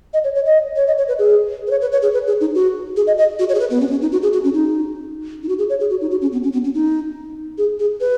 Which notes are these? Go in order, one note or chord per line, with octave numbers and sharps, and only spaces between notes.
D#5
C#5
C#5
D#5
C#5
D#5
C#5
B4
G#4
B4
C#5
B4
C#5
G#4
B4
G#4
D#4
F#4
G#4
D#5
D#5
F#4
C#5
G#4
B4
B3
C#4
B3
C#4
D#4
F#4
G#4
F#4
C#4
D#4
D#4
F#4
G#4
C#5
G#4
F#4
D#4
F#4
C#4
B3
C#4
B3
C#4
D#4
G#4
G#4
B4